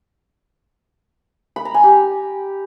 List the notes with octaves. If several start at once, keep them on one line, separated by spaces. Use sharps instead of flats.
B5
A#5
G#5
G4